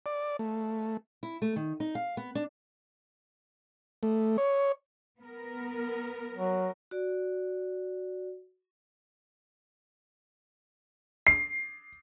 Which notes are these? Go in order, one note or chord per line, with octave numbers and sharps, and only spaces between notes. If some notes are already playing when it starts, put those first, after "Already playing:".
D5
A3
E4
A3
D#3
D#4
F5
B3
D4
A3
C#5
B3 A#4
F#3
F#4 D5
C7